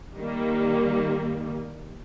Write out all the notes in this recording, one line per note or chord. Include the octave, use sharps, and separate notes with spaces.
D#3 G3 A#3